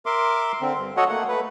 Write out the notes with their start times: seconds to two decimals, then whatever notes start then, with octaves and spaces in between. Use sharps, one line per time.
0.06 A#4 E5 C6 D6
0.61 D3 C4
0.77 G2
0.97 F#4 A4 C#5 D#5 F#5
1.09 A3 A#3 F#5
1.28 A3 B4